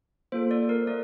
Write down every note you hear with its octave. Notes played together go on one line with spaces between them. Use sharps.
A#3 F4 A4 C5
D5
A#4
A3 D5